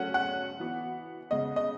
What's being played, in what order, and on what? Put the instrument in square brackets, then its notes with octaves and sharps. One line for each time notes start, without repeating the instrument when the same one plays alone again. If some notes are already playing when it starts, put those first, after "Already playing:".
Already playing: [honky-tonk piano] F#3 A3 C#4 F#4 [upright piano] F#5
[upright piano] F#5
[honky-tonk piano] E3 B3 F#4
[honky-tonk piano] C#3 G#3 B3 [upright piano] D#5
[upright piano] D#5